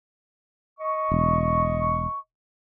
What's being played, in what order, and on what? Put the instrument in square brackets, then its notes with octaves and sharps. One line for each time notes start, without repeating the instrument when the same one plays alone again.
[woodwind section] D#5 C#6
[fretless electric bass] E1